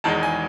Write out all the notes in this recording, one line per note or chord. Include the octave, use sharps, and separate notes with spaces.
E1 E2 D#3 G#3 A5
G#5